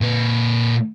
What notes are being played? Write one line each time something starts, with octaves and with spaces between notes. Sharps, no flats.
A#2 B4